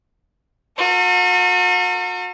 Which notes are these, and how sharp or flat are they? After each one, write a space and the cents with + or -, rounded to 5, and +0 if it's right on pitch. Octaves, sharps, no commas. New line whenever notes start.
F#4 -45 A#4 -45